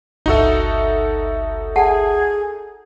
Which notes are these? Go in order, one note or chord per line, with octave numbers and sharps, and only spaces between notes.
G1 C#2 D#4 F#4 A4 E5
G#4 F#5 A5